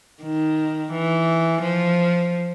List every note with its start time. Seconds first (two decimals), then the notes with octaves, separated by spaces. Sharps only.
0.22 D#3
0.92 E3
1.62 F3